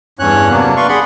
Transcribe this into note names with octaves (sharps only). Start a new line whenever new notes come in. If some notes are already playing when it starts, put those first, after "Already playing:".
E2 G2 C#4 C#5 F#6
C3 F#3 A#3 B3 D4
B4 D5 F5 C6 C#6
G#4 D5 F#5 B5 C6